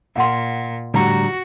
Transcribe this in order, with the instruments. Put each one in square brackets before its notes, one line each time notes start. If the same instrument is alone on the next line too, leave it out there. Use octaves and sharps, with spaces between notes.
[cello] A#2 [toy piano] F5 F#5 C6
[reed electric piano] A2 A#5 [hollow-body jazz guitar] D3 F3 G3 [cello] F#4